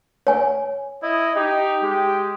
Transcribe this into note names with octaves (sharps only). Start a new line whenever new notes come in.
C#5 G#5
E4 D#5
D#4 G4
G#3 G4